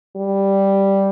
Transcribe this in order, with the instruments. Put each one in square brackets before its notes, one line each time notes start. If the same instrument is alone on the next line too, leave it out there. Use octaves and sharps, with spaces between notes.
[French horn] G3